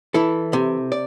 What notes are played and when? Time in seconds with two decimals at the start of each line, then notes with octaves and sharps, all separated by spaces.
0.14 E3 E4 A4
0.53 C3
0.92 D5